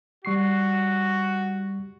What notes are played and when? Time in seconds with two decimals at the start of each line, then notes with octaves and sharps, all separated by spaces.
0.25 G3 F#4 C#6 C7